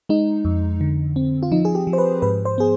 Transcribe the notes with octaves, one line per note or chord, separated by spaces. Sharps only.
G#3 D#4
F2
D3
C4
F4
F3 D#4
G#4
G4
F3
C5
B4
G#2 B4
C5
B3 G#4